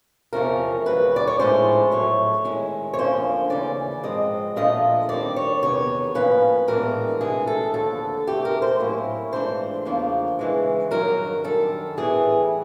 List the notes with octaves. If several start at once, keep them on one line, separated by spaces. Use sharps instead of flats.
E2 C3 F3 A3 C#4 A#4
D2 C#3 F#3 B4
D5
C#5
A2 F3 G#3 C#4 E4 C5
A2 F#3 A3 C#5
D#3 G#3 C#4 E4
C#5
D2 D3 F3 A#3 C#4 C5
D#2 C#3 E3 C#4 D5
G#2 F3 G#3 C4 D#5
A#2 F3 A3 D4 F4 D#5
D#3 G3 C4 D5
C#5
E2 C3 D#3 B3 C#5
A2 F3 A#3 C#4 B4
A2 E3 G#3 B3 D4 A#4
C3 E3 G#3 G#4
A4
D#2 D3 F3 A4
D2 C3 E3 A3 G4
A#4
C5
A2 F#3 A#3 C#4 E4
G#2 E3 A3 D4 F4 C5
E2 C#3 F3 A#3 D4
C#3 E3 G#3
G2 D#3 F#3 A#4
F#2 D#3 G3 A4
A2 E3 G3 B3 G#4